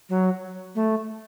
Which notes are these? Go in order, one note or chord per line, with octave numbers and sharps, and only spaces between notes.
F#3
A3